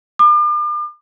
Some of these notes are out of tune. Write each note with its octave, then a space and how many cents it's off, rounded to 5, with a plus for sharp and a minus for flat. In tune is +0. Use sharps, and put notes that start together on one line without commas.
D6 +40